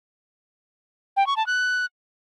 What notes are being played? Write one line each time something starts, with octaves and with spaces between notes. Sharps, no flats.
G5
C#6
A5
F#6